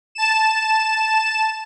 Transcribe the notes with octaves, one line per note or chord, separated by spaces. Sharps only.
A5 E7